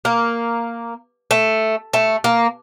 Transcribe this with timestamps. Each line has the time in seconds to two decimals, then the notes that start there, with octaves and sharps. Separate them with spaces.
0.05 A#3
1.31 A3
1.93 A3
2.24 A#3